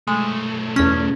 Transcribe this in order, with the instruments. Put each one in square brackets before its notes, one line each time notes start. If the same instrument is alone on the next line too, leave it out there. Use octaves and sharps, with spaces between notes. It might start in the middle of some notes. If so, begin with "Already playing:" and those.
[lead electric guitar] B1 A3 [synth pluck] G#3
[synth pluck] E2 C#4